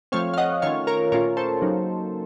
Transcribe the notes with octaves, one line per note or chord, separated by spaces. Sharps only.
F3 A3 C4 C#5 F5
F5
D#5 F#5
D#3 A3 C#4 F4 C#5 F5
A#4 C#5
A#2 A3 C#4 F4 A#4 C#5
A4 C5
C#3 F#3 A#3 D#4